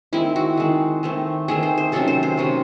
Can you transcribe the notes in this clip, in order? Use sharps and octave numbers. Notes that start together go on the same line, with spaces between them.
D#3 G#3 C4 E4
F#4
D#3 G#3 C4
D#3 A3 C4
D#3 A3 C4 G#4
C5
C5
C3 D#3 F#3 C#4 A4
C5
C5
C3 D#3 F#3 C#4